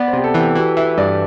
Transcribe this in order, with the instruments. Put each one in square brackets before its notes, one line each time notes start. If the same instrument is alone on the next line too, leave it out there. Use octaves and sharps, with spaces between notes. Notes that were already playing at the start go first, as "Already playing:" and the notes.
Already playing: [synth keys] B3 [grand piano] D5
[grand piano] C5
[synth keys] C3 [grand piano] G4
[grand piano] A4
[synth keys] E3
[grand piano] G4
[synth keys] E3 [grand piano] F#4
[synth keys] E3 [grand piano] E5
[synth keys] G2 [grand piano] D5